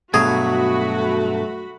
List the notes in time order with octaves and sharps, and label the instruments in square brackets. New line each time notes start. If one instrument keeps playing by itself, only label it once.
[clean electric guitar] G2 B2 F#3 [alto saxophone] A3 [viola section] F#4 B5 [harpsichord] G#4